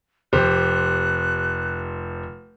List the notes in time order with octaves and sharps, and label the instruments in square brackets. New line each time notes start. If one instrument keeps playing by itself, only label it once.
[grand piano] F1 G4 C5 [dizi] F#6